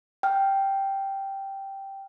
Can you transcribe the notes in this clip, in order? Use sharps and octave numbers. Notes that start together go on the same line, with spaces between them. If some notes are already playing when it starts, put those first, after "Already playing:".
G5 F6